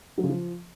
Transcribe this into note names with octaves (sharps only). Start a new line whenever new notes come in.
F#3
C#3
F3